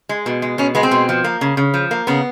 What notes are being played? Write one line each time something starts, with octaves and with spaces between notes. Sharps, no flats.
G#3
B2
G#3
B2 C#4
G#3 B3
C4
B2
F3
A#3
C#3
C#3
F3
A#3
C#3 B3